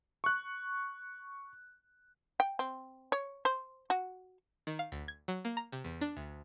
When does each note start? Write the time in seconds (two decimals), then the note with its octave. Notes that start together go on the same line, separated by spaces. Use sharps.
0.24 C#6 F#6
2.40 G5
2.59 C4
3.12 C#5
3.45 C5
3.90 F#4
4.67 D#3
4.79 F5
4.92 D2
5.08 G#6
5.28 F#3
5.45 A#3
5.57 A#5
5.72 C3
5.84 E2
6.01 D4
6.17 D2